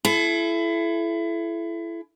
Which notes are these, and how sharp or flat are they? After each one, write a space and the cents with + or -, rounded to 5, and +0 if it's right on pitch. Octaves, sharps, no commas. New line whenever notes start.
E4 +25 A4 -35